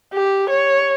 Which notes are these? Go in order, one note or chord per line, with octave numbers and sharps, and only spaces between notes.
G4
C#5